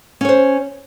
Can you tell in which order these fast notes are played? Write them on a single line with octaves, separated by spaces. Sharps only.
C#4 C#5 C5